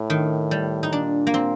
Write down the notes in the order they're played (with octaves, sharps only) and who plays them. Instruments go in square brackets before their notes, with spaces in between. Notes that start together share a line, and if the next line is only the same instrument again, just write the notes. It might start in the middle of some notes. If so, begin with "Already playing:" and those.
Already playing: [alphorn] A2
[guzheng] D#3
G3
D#4
[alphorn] A#2 [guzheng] D4
[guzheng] A#3
C4